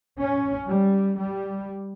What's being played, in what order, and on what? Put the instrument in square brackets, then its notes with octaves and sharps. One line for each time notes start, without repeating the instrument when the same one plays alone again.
[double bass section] C#4
G3
G3